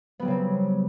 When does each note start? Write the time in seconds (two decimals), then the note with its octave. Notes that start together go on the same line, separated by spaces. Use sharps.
0.20 B3
0.22 G3
0.25 F#3
0.27 C#3
0.30 C4